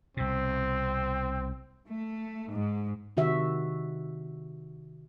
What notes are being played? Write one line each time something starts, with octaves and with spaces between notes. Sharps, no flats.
C2 B2 C4
A3
G#2
C3 D#3 F#4 E5